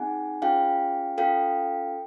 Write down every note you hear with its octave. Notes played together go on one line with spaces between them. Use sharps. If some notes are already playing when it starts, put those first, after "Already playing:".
Already playing: C4 D#4 G#4 F#5 G#5
C#4 F4 G#4 F5 G5
C#4 F4 A4 F5 G5